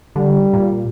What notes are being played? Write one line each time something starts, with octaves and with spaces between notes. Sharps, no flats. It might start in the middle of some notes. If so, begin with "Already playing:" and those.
D3 G3
A#2